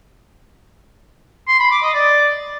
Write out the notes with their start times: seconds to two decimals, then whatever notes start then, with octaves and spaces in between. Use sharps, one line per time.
1.48 C6
1.60 B5
1.71 D6
1.82 D#5
1.94 D5